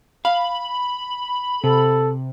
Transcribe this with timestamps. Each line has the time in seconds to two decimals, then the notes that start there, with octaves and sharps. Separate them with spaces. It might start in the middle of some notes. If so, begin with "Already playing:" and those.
0.25 F5 B5
1.64 C3 A4